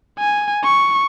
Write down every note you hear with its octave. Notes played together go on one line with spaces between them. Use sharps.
G#5
C#6